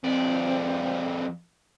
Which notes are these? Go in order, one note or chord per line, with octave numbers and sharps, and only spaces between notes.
F2 C4 D5